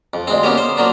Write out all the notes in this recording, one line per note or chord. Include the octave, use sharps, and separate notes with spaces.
F2
D2 G#3 C4
A#3 B3 C#4 G4
C5
F3 F#3 A#3 D4